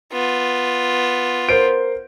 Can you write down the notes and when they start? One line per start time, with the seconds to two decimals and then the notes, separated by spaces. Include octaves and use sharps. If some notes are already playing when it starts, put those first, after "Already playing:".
0.13 B3 F4
1.49 A#4 C5 D7